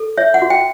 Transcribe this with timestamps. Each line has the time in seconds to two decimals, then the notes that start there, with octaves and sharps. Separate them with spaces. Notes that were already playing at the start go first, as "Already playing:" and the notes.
Already playing: A4
0.17 C#5 E5
0.34 F#5
0.42 F#4
0.50 G5